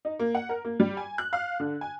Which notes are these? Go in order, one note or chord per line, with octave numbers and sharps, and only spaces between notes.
D#4
A#3
F#5
A#4
A#3
G3
G#5
F#6
F5
D3
G#5